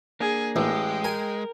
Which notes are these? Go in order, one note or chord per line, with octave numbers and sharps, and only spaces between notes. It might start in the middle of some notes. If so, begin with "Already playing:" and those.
A#3 D4 G#4
A1 G#3 G5
A#4 G#5